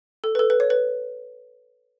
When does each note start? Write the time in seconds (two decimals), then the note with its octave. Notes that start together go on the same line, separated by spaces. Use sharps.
0.24 A4
0.35 B4
0.39 A4
0.50 B4
0.60 C#5
0.70 B4